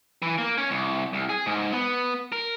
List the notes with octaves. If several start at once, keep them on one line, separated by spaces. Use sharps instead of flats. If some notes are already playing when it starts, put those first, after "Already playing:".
E3
A#3
C#4
C2
C2
G#4
G#2
B3
A#4